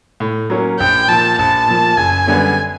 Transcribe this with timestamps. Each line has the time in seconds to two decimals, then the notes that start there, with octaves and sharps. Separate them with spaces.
0.20 A2
0.50 F#3 A#3 C#4
0.80 A#1 G5
1.08 A#2 F3 A5
1.38 A#1 A5
1.67 A#2 F3
1.97 F#1 G#5
2.27 F#2 D3 G3 B3